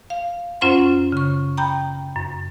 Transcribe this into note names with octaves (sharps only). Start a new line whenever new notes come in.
F5
F#2 C#4 F4 C5 F#5 C6
C#3 C#6
G5 A#5 B5 G6
F#2